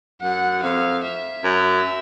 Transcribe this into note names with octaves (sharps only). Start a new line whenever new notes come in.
F#2 F#5
F2 F5
E5
F#2